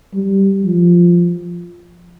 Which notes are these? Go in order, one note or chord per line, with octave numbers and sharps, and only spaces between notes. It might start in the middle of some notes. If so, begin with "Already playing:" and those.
G3
F3